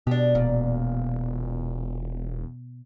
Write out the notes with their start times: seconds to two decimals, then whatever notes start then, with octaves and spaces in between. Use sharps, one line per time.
0.07 B2 D4 G4
0.35 E1 A#2